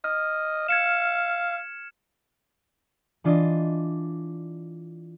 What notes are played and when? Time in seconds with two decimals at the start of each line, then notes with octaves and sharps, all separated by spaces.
0.04 D#5 F6
0.68 F5 G#6 C#7 E7
3.24 E3 D4 F4 D5 D#5